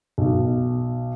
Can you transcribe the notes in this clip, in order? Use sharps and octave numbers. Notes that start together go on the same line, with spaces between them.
B1